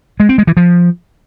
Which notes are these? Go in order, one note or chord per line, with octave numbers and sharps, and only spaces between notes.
G#3
C4
G#3
E3
F3